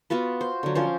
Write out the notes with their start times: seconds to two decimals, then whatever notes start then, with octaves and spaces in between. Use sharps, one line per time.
0.10 B3 F4 F#4 B4
0.41 C5
0.63 D3 F#3
0.75 F3 C#4 C5